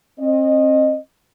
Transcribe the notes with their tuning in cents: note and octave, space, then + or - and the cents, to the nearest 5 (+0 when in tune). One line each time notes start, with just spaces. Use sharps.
C4 +35 D#5 -15